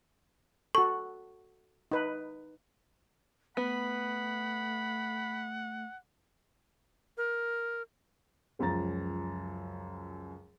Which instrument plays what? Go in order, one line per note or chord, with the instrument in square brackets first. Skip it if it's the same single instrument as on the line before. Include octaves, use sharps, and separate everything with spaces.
[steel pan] F#4 A4 [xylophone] C#6
[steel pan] D#4 B4
[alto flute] A3 [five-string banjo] B3 [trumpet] F#5 [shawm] B5
[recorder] A#4
[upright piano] C#2 F#2 F3 A#5 A6